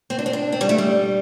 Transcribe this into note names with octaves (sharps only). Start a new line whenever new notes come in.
C4
D4
C4
D4
C4
G3
A3
G3